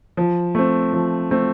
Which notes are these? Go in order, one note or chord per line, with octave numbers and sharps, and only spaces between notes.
F3
A3 C4
F3
A3 C4